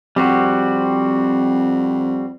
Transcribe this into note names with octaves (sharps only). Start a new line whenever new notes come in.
F2 G3 C4 F#4